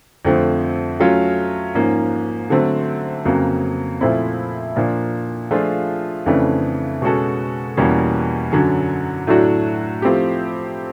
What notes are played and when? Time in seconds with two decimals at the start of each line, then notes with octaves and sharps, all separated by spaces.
0.25 F2 D3 F3 A3 C4
1.00 F#3 A3 C#4 F4
1.75 G#2 F3 A#3 C#4
2.50 D3 F#3 A3 C4
3.25 F2 C#3 F#3 A#3
4.01 A#2 F3 A3 C4 E4
4.76 A#2 F3 A#3 D4
5.51 F3 A3 D4 F4 G#4
6.26 F2 C#3 E3 A3 D4
7.02 B2 G#3 C#4 F#4 A4
7.77 E2 B2 G3 A#3 C#4
8.52 F#2 D3 F#3
9.27 A2 F#3 A3 D4 F#4
10.02 F3 A3 C4 E4 G4